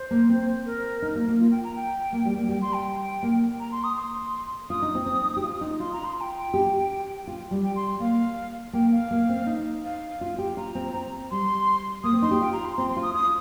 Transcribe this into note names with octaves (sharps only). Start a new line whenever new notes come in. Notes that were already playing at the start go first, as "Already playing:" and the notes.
Already playing: C5
A#3
C4
A#4
D#4
A#3
A#3
F4
G5
A#5
G5
A#3
G3
A#3
G3 G5
C6
G5
A#3
A#5
C6
D#6
C6
F4 D#6
D#4
C4
C4
D#4
G4
F4
D#4
F4 C6
A#5
C6
A#5
G5
G4
F4
G3
G5
C6
A#3 F5
A#3 G5
F5
A#3
C4
D#4
F5
F4
G4
F4 A#5
C4
C4
G3 C6
A#3 D#6
C4
D#4 C6
G4
F4 G5
A#5
C6
C4 C6
C6
F4
D#6
F4 D#6